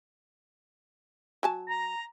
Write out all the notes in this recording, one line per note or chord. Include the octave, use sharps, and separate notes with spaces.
F#3 G#5 A5
A#5